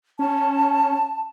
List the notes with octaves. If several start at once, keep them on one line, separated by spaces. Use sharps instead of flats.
C#4 A5